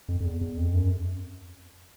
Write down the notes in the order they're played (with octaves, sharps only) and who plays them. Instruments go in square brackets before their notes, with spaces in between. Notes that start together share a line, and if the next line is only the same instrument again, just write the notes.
[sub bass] F2
F2
E2
E2
F2
F#2